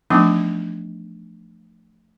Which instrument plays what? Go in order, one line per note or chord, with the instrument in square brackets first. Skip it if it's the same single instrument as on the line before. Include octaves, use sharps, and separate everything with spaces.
[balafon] E3 F3 A3 B3 D4 D#4